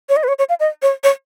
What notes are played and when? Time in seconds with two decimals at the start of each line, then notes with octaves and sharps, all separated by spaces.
0.09 C#5
0.16 D#5
0.23 B4
0.28 C#5
0.39 C#5
0.49 F5
0.60 D#5
0.82 C#5
1.04 C#5